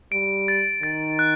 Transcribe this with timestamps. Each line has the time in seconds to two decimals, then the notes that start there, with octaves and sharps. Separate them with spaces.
0.12 G3 D7
0.48 A6
0.83 D#3 A6
1.19 F#6